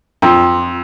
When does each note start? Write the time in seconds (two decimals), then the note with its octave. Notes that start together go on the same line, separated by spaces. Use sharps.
0.22 F2